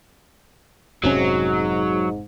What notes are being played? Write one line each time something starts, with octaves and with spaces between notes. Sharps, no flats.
F1 G#2 C3 F#3 C#4